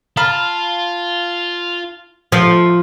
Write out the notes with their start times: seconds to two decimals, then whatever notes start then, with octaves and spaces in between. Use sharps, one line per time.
0.17 F4 A5 B5 F6
2.32 F3 A3